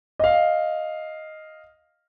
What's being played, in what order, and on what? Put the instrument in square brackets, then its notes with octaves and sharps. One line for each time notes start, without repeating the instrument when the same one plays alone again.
[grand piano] D#5 F5